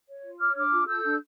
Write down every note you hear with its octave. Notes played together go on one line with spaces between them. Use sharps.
C#5
F4
C#5 D6 F6
D4 D6 F6
F4
A4 E6 G6
D4